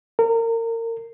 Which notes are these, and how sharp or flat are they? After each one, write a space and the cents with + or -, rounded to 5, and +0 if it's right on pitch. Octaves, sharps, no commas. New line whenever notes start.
A#4 -30